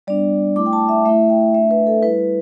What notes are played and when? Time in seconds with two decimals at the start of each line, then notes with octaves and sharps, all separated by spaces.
0.07 G3 B3 D4 D5
0.56 A3 E4 D6
0.66 G5
0.73 A5
0.89 E5
1.05 A3 E4 E5
1.30 G5
1.54 A3 D4 E5
1.71 B4
1.87 A4
2.03 G3 E4 B4